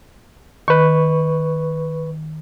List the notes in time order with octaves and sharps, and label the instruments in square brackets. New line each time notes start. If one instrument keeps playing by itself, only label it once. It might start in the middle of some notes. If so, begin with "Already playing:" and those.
[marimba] D#3 [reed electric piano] B4 C#6